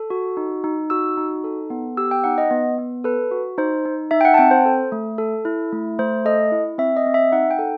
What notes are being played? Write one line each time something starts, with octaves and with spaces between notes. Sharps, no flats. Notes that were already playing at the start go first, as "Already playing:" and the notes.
Already playing: A4
F#4
D#4
D#4
F#4 E6
D#4
A4
B3
G4 E6
G5
D#4 F#5
D#5
B3
B3
A4 B4
F#4
D#4 C5
D#4
D#4 E5
G5
F#5
A5
C4 G5
C5
A4
A3
A4
E4
A3
A3 C5
A4 D#5
E4
C4 E5
D#5
C4
E5
D#4 F#5
G5
A4